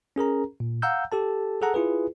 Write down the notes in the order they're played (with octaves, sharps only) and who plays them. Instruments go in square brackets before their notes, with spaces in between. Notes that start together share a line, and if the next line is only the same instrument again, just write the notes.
[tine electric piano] C#4 G#4 A#4 A#5
A#2
F5 F#5 A#5 E6 G6
G4 A4 A5
G#4 A4 F#5 A#5
E4 F4 G#4 B4